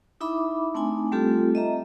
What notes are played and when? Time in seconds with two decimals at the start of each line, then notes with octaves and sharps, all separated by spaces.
0.21 D#4 E4 E5 B5 D6
0.75 A3 C4 D4 D#4 G#5 C6
1.12 G3 A3 C4 F4 G4 A4
1.55 D#5 E5 A#5